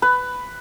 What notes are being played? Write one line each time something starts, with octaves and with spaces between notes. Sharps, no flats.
B4